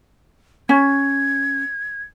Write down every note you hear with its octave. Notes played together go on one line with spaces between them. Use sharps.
C#4 G#6